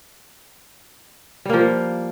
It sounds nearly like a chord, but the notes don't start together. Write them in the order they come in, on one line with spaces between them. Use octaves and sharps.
G3 A#3 F3